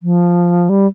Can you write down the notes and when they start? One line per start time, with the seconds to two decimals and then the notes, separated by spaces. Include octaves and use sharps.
0.03 F3
0.69 G3